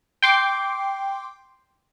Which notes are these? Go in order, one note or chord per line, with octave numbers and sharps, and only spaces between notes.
G5 C6 D6